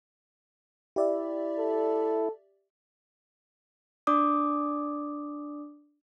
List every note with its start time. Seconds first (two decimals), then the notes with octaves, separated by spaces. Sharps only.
0.96 E4 G4 D5 E5
1.59 A4
4.07 D4 D5 D6 D#6